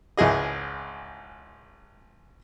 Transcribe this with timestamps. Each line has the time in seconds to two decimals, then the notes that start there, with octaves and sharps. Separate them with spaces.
0.17 G#1 C#2 E4 G#4 D#5